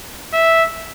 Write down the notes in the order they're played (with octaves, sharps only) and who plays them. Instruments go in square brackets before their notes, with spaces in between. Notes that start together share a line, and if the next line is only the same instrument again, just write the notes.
[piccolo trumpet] E5